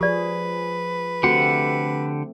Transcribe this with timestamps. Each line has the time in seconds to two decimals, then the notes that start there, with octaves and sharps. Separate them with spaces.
0.01 F3 G4 G#4 B4 D5
1.23 D3 A3 C4 F#4 G4 A4 F#5